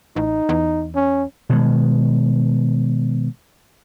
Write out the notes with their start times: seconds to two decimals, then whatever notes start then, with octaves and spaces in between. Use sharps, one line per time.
0.16 A1 D#4
0.49 E2
0.95 C#4
1.49 B2 D#3 G#3